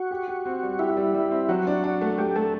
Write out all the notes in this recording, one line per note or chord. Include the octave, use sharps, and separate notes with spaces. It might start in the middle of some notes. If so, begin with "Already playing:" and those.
Already playing: F#4
G4
G4
C4
G3
E4 G4
G3
G3
C4
F#3 F#4
D4
D4
A3
A3 G4
A3 A4